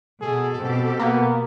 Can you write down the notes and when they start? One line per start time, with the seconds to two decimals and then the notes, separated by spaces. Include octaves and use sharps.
0.21 B2 G#4 A4
0.59 B2 C4 G4
0.99 A#3 B3